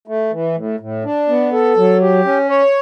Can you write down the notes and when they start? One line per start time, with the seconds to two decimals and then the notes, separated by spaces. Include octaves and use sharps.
0.08 A3
0.32 E3
0.55 A2
0.80 A2
1.04 D4
1.29 B3
1.53 A4
1.77 F#3
2.01 G4
2.25 C#4
2.49 C#5